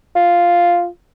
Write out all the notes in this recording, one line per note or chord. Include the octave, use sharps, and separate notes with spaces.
F4